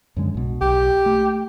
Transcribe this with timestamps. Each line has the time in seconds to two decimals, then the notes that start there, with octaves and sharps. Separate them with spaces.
0.16 F#2 D3 G#3
0.34 B1 B2
0.61 B1 G4
1.06 A3